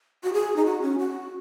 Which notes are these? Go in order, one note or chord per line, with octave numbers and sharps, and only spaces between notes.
F#4
G#4
D#4
F#4
C#4
F#4